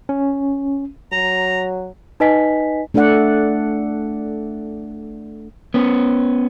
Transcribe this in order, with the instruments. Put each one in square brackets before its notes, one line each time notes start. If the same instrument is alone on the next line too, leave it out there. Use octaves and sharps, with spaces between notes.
[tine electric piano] C#4
[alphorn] F#3 [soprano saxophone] A#5
[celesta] D#4 B4 D#5 G#5 B6
[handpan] A3 D4 A4 D5 F#5
[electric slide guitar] B3 C#4